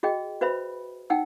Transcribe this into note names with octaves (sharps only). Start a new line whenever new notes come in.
F#4 G#4 D#5 G5
F#4 B4 C5 E5 B5
D#4 F#5 G5 E6